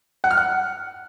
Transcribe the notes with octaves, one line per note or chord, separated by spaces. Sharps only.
F#5
F6
F#5